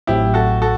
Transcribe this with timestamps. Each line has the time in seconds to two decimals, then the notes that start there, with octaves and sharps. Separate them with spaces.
0.07 A1 A2 F#3 C4 E4 G4
0.34 F#4 A4
0.62 F#4 A4